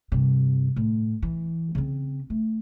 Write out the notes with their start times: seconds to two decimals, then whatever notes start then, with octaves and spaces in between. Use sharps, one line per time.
0.12 G2 C3
0.76 A2
1.22 E3
1.75 C#3 C4
2.30 A3